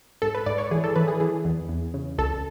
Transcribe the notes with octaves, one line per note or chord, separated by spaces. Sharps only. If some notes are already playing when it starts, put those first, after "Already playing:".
G#2 A4
B4
G#2 D5
C#5
E3 G#4
A4
E3 B4
G#4
E3 G#4
E2
E2
C#3
C#2 A4